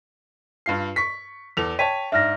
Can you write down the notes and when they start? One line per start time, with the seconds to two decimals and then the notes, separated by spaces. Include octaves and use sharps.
0.66 G2 F4 C7
0.96 C#6 B6
1.57 E2 A4 F7
1.79 C#5 G5 A5 B6 D#7
2.12 G#2 D4 E5 F6 A#6